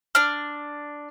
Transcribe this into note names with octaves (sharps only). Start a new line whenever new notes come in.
D4 F6